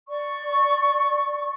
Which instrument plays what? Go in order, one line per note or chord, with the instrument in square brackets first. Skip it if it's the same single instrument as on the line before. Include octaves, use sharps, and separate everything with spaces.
[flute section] D5 C#6